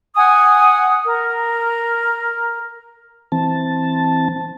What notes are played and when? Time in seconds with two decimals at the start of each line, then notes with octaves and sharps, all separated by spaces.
0.15 F#5 G#5 D#6
1.04 A#4
3.32 E3 C4 A5